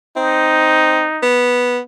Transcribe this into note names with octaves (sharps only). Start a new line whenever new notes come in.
C4 D#4
B3